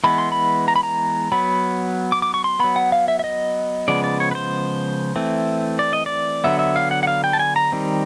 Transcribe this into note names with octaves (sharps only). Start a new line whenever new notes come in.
E3 G#3 B3 B5
C6
B5
A#5
B5
A#5
F#3 B3 B5
D6
D6
C#6
C6
F#3 B3 B5
F#5
F5
E5
E5
D#5
C#3 F3 G#3 B3 D5
D5
C#5
B4
C5
E3 A3 C4
D5
D#5
D5
D3 F#3 B3 E5
E5
F5
F#5
F#5
F5
G5
A5
G#5
A#5
D#3 G3 C4